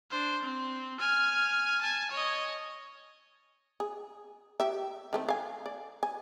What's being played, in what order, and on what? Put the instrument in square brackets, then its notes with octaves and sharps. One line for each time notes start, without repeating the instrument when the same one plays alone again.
[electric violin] D4 C5
C4
G#5 F6
G#5 A5
C#5 D#5
[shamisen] G#4
G4 E5
D#3 A3 C4
F5 G#5
D5
G#5